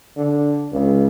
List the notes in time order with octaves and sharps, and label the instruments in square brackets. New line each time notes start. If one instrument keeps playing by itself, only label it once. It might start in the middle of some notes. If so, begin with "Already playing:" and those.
[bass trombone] D3
C#2